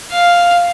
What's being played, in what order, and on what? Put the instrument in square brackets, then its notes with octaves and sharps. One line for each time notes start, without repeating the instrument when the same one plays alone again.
[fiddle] F5